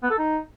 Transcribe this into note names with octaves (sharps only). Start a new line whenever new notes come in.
B3
A4
D#4